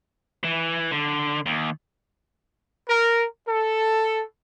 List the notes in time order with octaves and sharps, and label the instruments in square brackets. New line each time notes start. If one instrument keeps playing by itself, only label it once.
[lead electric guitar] E3
D3
D#2
[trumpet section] A#4
A4